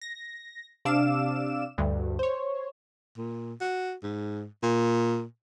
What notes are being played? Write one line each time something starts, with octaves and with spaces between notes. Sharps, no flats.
A#6
C3 D4 F5 D6 E6 E7
D2 G2
C5 C#5
A#2
F#4
G#2
A#2